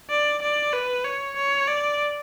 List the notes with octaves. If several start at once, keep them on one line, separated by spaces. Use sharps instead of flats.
D5
D5
B4
C#5
C#5
D5